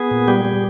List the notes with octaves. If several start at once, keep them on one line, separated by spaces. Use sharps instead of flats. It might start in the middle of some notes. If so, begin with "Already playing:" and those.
Already playing: B3 G#4
A#2
G3 G4
G3